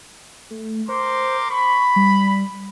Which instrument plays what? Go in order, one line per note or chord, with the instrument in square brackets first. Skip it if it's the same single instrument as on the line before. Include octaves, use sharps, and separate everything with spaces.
[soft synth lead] A3
[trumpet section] A#4 C6 D6 [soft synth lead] C5
[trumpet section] B5 [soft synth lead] C#6
[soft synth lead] G3